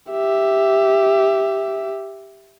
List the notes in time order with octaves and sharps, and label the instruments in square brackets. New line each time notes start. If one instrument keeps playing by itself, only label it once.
[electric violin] G4 E5